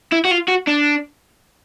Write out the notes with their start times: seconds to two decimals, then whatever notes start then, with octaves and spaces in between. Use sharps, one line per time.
0.12 E4
0.25 F#4
0.31 F4
0.48 F#4
0.67 D4